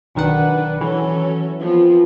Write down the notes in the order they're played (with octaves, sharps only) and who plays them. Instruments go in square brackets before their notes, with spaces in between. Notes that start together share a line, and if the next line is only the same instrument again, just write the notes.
[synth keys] B1 D#3 F#5 [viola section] D4 B4
[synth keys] E3 [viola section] F#3 C#4 A4
[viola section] F3 B3 C4